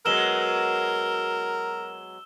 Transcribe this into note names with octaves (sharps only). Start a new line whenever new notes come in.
F#3 G#3 B3 A#4 E6 E7 G7